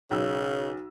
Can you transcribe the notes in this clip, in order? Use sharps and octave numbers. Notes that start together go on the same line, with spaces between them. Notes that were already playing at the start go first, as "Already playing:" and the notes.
B1 C#3 E6